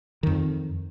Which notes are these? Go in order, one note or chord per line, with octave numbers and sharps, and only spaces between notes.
F2 D#3